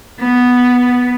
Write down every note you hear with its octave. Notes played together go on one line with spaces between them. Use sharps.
B3